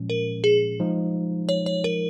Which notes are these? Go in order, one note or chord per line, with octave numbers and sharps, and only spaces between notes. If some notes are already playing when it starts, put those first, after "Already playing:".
Already playing: A#2 F3 G#3 C#4
A#4
G#4
F3 G#3 D#4
C#5
C#5
A#4